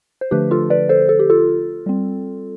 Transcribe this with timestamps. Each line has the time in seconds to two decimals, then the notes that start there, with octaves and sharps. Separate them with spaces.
0.21 C5
0.31 D3 F3 A3 D4 G4 B4
0.51 F4 A4
0.70 B4 D5
0.89 A4 C5
1.09 A4
1.19 G4
1.30 F4 A4
1.86 G3 C4